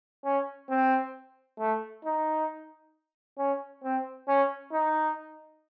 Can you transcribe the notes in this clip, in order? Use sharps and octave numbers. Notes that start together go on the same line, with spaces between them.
C#4
C4
A3
D#4
C#4
C4
C#4
D#4